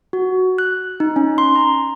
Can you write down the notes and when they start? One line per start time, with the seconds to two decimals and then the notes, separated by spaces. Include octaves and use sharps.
0.13 F#4
0.58 F#6
1.00 D#4
1.16 C#4
1.38 C6
1.56 A#5